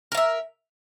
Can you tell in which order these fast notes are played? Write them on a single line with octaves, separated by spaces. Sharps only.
A#4 F5 E5